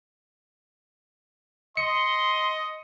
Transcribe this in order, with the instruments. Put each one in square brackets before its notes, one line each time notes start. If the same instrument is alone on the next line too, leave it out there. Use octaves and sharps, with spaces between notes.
[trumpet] D#5 [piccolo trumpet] C6 [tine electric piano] C#7